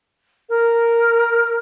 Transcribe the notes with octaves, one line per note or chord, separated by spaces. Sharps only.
A#4